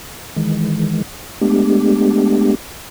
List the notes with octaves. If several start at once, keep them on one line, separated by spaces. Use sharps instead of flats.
D#3 E3 G#3
G#3 A3 B3 D4 G4